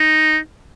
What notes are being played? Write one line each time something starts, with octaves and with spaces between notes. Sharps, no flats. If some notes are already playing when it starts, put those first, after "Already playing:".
Already playing: D#4